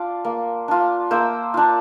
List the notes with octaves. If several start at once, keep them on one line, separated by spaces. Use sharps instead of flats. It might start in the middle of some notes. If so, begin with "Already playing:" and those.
Already playing: D4 F4 D5
A#3
D4 F4
A#3 C5 E5
D4 F4